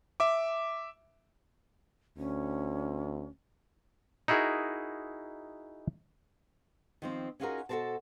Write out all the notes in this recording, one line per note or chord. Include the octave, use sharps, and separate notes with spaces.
E5 D6
D2 C#4
D#4 E4 F#4 G#4 A#4
D#3 F3 C4
C#4 D#4 F4 F#4 G#4 A#4
B2 F#4 A4 A#4 C5 A5